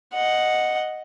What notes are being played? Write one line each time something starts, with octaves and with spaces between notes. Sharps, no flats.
D#5 F#5